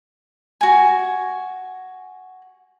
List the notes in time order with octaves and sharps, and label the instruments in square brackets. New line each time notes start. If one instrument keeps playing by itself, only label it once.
[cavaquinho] F#4 G#5